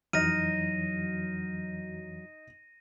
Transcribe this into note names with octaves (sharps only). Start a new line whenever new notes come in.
F2 E3 F#3 D#4 D#5 F6 A#6 D#7